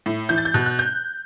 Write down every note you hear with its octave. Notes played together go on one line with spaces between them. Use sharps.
A2
E3 G6
A6
G6
B2 F#6
F#6
G6